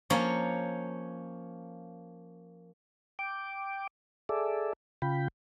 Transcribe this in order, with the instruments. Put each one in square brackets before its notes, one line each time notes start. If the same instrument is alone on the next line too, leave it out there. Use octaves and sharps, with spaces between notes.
[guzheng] F3 A#3 C#4 C#5
[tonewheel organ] G5 D6
G#4 A4 D5 E5
C#3 F4 G5 B5